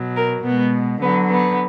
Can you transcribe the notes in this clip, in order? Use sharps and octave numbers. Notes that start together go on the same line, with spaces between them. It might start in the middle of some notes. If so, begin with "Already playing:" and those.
Already playing: B2 F#3
A#4
B2 G#3 B3
D3 F#3 B3
B3